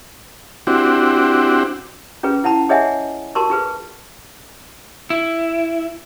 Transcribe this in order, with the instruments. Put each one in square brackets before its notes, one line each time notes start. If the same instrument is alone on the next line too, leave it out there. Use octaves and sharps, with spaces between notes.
[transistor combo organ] C4 D4 E4 F#4 G4
[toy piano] C#4 F4 G#4 B4
E4 F#5 A5 B5
G#4 C#5 D#5 E5 F#5 G#5
F#4 A#4 A5 C6 C#6
F4 G#4 B4
[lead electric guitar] E4